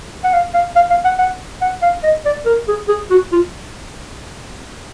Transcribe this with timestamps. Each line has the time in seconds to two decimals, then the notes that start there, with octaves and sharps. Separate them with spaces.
0.24 F#5
0.34 F5
0.54 F5
0.76 F5
0.91 F5
1.04 F#5
1.19 F#5
1.62 F#5
1.82 F5
2.04 D#5
2.25 D5
2.46 A#4
2.68 G#4
2.88 G#4
3.10 F#4
3.32 F4